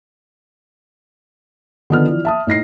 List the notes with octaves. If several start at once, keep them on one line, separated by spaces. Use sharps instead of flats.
D3 D#3 F3 B3 D4 F6
E3 F3 D5
E5 A5 D#6
A2 D#4 A#6 C7